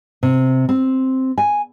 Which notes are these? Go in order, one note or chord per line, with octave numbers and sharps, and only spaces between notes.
C3
C4
G#5